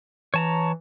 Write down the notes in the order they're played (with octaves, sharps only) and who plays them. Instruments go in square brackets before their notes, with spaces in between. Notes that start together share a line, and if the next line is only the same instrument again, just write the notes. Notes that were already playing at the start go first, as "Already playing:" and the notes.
[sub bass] E3 [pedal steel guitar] C#5 A5 A#5